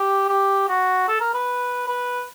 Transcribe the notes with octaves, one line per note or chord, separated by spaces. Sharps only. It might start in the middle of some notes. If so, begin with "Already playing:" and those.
Already playing: G4
G4
F#4
A4
A#4
B4
B4